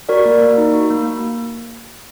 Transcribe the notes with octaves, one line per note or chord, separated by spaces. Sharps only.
F#4 A#4 D5
A#3
A#3
D#4
F#4
A#3
A#3